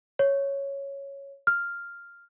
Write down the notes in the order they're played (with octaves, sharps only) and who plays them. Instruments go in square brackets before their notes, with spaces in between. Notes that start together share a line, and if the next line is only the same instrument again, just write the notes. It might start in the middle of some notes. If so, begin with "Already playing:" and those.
[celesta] C#5
F6